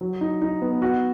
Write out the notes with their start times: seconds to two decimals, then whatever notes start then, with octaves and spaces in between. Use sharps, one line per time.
0.01 F#3
0.21 D#4
0.41 D#4
0.61 B3
0.82 F#4